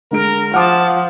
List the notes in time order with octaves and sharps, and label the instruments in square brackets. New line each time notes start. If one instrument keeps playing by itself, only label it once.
[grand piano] D3 G#3 D7 [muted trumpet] A#4
[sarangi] F3 [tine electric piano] F#5 D#6 [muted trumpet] A5 [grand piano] C6 D6 F6